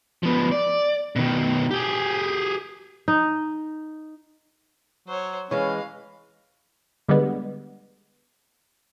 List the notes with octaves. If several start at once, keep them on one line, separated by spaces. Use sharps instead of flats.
F3 B3
D5
B2 D#3
G4 G#4
D#4
F#3 C5 C#5
E3 G#3 C#4 C#5 F5
D3 G3 G#3 B3